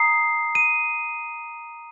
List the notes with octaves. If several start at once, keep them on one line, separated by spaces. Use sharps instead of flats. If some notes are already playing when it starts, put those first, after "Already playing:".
Already playing: A#5 D#6 C7
D#7